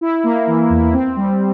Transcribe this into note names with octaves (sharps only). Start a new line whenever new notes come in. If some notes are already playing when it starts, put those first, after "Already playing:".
E4
A#3
E3
E2
C4
G3